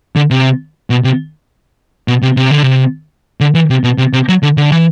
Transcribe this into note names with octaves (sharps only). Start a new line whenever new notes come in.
D3
C3
B2
C3
B2
C3
C3
D3
C3
D3
E3
C3
B2
C3
C3
F#3
D3
D3
E3